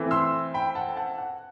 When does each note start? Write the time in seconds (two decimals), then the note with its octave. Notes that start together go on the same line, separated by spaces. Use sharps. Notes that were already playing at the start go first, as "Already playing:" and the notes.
Already playing: E3 A3 C4
0.11 C6 E6
0.54 G5 B5
0.75 F#5 A5
0.97 F#5 A5
1.19 F#5